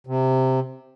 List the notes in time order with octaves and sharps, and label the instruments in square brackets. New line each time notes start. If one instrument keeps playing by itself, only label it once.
[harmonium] C3